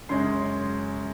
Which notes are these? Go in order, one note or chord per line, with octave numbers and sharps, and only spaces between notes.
F#2 C#3 G#3 C#4 C6